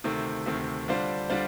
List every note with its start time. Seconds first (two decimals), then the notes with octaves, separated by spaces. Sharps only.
0.04 D2 C3 D#3 A3 C4
0.46 D2 C3 D#3 A3 C4
0.88 D3 G3 D4 F4 C5
1.30 D3 G3 D4 F4 C5